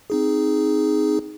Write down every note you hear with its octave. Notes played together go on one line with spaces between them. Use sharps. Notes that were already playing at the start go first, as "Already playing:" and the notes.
C4 D#4 G#4